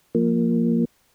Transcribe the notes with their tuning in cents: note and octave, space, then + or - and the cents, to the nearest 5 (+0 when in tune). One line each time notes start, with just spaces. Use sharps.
F3 +0 A#3 -5